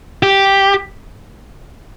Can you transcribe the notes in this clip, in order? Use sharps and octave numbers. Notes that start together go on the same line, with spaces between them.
G4